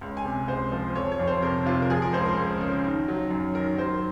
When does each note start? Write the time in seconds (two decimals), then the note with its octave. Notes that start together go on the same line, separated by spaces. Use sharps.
0.01 C#2
0.17 G#5
0.25 C3
0.48 C#2 C5
0.72 F3 C5
0.95 F2 C#5
1.12 C#5
1.20 F2
1.27 C5
1.42 C3 A#4
1.66 C3 F4
1.82 A#4
1.90 F3 G#4
2.02 A#4
2.13 C#2 C5
2.26 A#4
2.37 C#2
2.61 C#3
2.84 D#3
3.08 F#3
3.31 F#2
3.55 D#3 A#4
3.78 F#3 C5